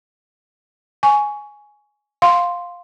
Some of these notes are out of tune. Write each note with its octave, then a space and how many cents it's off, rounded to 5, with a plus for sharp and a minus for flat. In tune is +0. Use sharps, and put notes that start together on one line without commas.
G#5 +5 C#6 +20
F5 +10 C6 +0